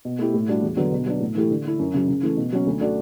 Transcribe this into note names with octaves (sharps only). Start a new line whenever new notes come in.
B2
A3 E4 G4
A2
G3 D4 F#4
E2
D3 F#3 B3
B2
F#3 B3 D4
A2
E3 A3 E4 G4
D3
A3 E4
F#2
C#3 F#3
C#3
E3 A3
B2
F#3 C#4
D2
D3 A3 D4 F#4